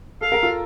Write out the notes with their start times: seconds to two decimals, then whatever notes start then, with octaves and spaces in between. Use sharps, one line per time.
0.21 A4 F5
0.32 A#4
0.43 F4 A4